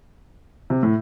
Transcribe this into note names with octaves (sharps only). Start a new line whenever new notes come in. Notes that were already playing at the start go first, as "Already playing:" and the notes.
C3
A2